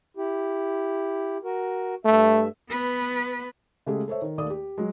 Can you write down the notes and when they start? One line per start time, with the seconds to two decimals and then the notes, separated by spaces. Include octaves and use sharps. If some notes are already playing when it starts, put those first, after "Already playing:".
0.17 E4 G4
1.44 F#4 A#4
2.05 G2 A3 E5
2.70 B3 B4
3.86 C#3 G#3 A3 G4 G#4
4.08 A4 C5 C#5 E5
4.22 D#3
4.38 D#2 A3 A#3 D5 D#6
4.50 G4
4.78 F#3 G#3